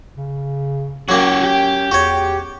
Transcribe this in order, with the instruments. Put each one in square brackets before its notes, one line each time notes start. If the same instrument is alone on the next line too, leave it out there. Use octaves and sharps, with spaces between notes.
[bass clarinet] C#3
[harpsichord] F#3 A#3 [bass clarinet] C#4 [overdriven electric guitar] F#4 G4
[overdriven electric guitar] G4
[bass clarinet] E2 [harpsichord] F#4 C#5